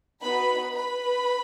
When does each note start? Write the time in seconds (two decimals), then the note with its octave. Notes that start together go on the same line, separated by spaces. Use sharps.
0.21 B3 D#4 F#4 B4 B5
0.74 B4 B5